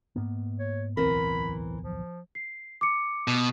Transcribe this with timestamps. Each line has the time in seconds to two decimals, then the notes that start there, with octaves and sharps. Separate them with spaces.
0.16 G#2 A#3 B3
0.59 C#5
0.97 D1 B1 E2 E3 C4 A#4 B5
1.83 F3
2.35 C7
2.81 D6 C#7
3.28 B2